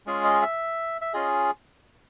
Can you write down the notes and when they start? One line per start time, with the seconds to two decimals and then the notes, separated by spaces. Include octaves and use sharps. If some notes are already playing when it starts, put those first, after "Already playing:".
0.06 G#3 C#4 F4 G#4
0.24 D#5
0.42 E5
1.01 E5
1.14 C#4 F4 G#4 D#5